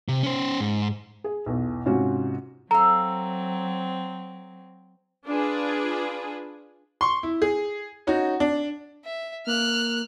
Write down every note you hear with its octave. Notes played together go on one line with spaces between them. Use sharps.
C3
C#4 C5
G#2
G#4
B1 E2
G#2 C3 C#4 F4 F#4
F#3 C4 A4 F5 A#5
D4 F4 G#4 B4
C6 C#6
E4
G#4
C#4 D#4 F#4
D4
E5
A#3 F6 F#6